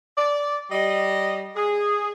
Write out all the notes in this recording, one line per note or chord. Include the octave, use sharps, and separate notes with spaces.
D5
G3 D#5
G#4